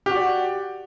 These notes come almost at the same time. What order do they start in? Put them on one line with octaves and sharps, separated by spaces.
G4 F#4 D5